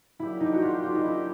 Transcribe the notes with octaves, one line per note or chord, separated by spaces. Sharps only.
F#3 A#3 D4 E4 G4
D#4
F#4
F4
F4
D#4
E4